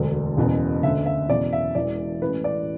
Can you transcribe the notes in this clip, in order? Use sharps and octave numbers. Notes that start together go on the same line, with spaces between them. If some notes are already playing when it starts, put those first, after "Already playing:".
Already playing: E1 D2 D3
F#1 E2 B2
D2 D3 E5
E5
F#1 E2 B2 D5
E5
E1 E2 E3 D5
A1 A2 E3 B4
D5